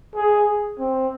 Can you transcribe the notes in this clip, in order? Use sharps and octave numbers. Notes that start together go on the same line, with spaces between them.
G#4
C4